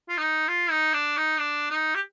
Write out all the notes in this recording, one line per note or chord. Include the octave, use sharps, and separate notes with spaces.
F4
D#4
F4
D#4
D4
D#4
D4
D#4
G4